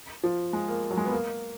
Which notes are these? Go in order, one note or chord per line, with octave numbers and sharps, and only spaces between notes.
F3
G#3
A#3
F#3
G#3
B3
A#3